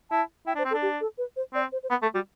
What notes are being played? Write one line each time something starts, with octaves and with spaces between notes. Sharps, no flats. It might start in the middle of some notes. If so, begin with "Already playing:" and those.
E4 A5
E4 G5
D4 C5
C4
A4
D4
G4
A4
B4
C5
C4 D5
C5
C5
B3 B4
A3 A4
G3 F#4